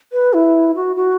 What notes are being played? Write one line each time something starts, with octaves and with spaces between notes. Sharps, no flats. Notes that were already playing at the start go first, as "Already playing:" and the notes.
B4
E4
F#4
F#4